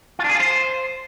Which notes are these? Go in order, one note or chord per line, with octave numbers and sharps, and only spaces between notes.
F4
D4
G#4
F4
C5